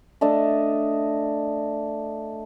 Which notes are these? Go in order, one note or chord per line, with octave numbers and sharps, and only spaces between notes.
A3 D4 D#5